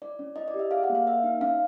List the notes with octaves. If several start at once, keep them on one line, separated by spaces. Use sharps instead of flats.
E4 D5
C#4
E4 D#5
D5
G4
E5
G#4 F5
F#5
A#3
F5
A#3 E5
D#4
C#4 F5